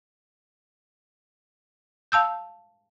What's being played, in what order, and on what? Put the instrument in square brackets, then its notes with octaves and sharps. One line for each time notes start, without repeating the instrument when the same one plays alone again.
[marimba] F5 A5 E6 G6